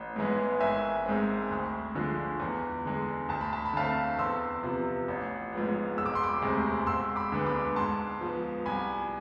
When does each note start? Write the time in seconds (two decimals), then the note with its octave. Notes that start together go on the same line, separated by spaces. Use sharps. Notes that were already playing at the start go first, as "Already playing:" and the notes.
Already playing: A1
0.16 G#2 E3 G#3 B3
0.61 G#1 E5 G#5
1.06 G#2 G#3 C4
1.50 D2
1.95 D3 F3 G#3
2.40 E2
2.85 D3 G#3
3.29 D2 A5
3.41 B5
3.53 A5
3.65 B5
3.73 D3 A3 C4 F5 A5
4.18 E2 C6 E6
4.63 C3 F3 B3
5.08 A1
5.52 G#2 F3 B3
5.97 E1 E6
6.06 D6
6.15 C6
6.23 B5 D6
6.42 D2 C3 G#3 C4
6.86 E1 C6 E6
7.16 B5 D6
7.32 D2 D3 G#3 B3
7.46 B5 D6
7.76 G#2 A5 C6
8.21 F3 B3
8.66 C2 G#5 B5